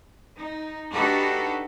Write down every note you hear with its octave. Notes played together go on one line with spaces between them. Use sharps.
D#4
D4 D#4 F#4 G4 A4 B4